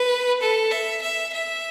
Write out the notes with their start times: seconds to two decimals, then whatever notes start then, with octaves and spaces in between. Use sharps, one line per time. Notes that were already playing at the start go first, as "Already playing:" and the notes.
Already playing: B4
0.42 A4
0.71 E5
1.02 E5
1.33 E5